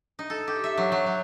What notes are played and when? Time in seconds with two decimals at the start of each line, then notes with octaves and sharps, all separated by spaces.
0.19 D#4
0.30 A4
0.48 G4
0.64 E5
0.77 F#3
0.92 F#3
1.06 F#3